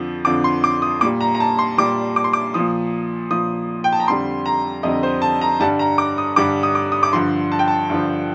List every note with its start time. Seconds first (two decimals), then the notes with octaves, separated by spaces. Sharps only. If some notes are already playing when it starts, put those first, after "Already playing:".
Already playing: F2 D3 F3
0.25 F2 D3 F3 D6
0.44 C6
0.64 D6
0.82 D#6
1.01 A#2 D6
1.05 G3
1.21 A#5
1.35 A#5
1.40 A5
1.59 C6
1.78 A#2 G3 D6
2.16 D6
2.24 C6
2.33 D6
2.54 A#2 F3 D#6
3.30 A#2 F3 D#6
3.84 G5
3.93 A5
4.00 A#5
4.08 F2 D3 G3 C6
4.46 A#5
4.83 F2 D3 G3 D#5
5.03 C5
5.22 A5
5.41 A#5
5.60 G2 D3 G3 A5
5.79 A#5
5.98 D6
6.18 D#6
6.36 G2 D3 G3 D6
6.63 D#6
6.75 D6
6.92 D#6
7.03 D6
7.13 G2 D3 F3 C6
7.52 A5
7.59 G5
7.68 A5
7.90 G2 D3 F3